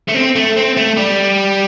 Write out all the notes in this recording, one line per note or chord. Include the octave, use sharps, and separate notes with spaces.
A3
C4
A3
C4
A3
G3